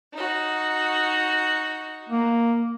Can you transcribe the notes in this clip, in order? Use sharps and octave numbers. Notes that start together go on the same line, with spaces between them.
D#4 F#4
A#3